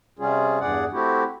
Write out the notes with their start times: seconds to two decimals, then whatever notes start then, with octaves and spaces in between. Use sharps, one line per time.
0.19 C3 G3 C#4 F4 G#4
0.60 E2 G2 G#4 D5 F#5
0.92 A3 C4 E4 F#4 G4